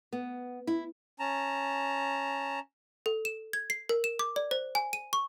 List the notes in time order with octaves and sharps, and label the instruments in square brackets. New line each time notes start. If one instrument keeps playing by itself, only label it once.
[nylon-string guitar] B3
E4
[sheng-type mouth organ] C#4 A5 A#5
[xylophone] A4
E7
G#6
C7
A#4
E7
D6
D5
C5
G#5
D#7
C#6